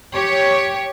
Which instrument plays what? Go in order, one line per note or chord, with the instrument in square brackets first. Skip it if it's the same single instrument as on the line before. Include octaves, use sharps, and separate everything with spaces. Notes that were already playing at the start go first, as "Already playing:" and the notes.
[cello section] G4 C#5